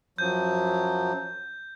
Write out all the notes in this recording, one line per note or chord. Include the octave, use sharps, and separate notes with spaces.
F#2 F3 F#3 G6